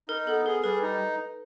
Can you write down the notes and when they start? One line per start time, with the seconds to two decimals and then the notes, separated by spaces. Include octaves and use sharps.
0.09 D#4 A#4
0.27 B3 A4
0.46 G#4 A#4
0.64 G3 B4
0.83 D#4